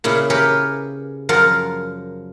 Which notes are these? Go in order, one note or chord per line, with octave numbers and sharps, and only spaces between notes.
A#2 C#3 E4
G4 G#4 A#4 B4 C#5
F#2 F3 F4 A#4 F#5